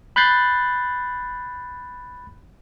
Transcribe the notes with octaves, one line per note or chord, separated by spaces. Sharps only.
B5 F#6 G6 A6 C7